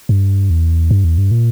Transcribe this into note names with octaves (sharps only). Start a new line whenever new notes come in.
G2
E2
G2
E2
G2
A#2